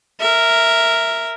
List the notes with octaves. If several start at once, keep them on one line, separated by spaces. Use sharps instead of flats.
A#4 E5